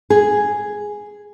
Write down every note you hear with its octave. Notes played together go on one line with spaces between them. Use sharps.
G#4